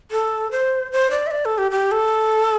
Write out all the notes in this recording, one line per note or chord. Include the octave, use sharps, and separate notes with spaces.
A4
C5
C5
D5
E5
D5
A4
G4
G4
A4